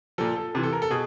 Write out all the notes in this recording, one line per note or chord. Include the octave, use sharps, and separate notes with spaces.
A#2 F3 A4
A4
C3 E3
A4
A#4
A4
B2 G#4